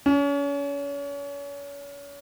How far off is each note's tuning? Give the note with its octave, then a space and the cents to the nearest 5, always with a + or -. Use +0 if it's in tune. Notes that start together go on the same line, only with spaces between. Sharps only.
C#4 +35